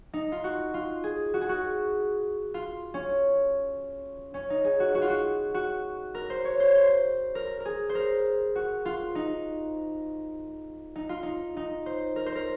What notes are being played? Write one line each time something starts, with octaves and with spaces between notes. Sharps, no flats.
D#4
F4
F#4
F4
G#4
F#4
G#4
F#4
F4
C#4
C#4
D#4
G#4
F#4
F#4
F4
F#4
F#4
A#4
C5
C#5
C5
C5
A#4
A#4
G#4
C5
A#4
F#4
F4
D#4
D#4
F4
D#4
D#4
C5
A#4
C5
A#4